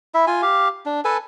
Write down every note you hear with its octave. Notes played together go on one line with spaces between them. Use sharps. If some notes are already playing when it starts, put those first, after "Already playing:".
E4 E5
F4 G#5
G4 F5
D4
A4 B4 G#5 A5